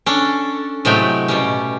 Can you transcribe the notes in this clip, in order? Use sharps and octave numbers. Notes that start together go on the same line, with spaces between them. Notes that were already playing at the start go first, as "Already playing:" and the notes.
C#4 D4 A4
A2 C3 F#3 G#3 A3 G5
B2 G3 C#4